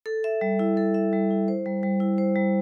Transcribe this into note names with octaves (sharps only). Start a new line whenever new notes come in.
A4
E5
G3
E4
A4
E5
G3
E4
C5
G3
G3
E4
C5
G3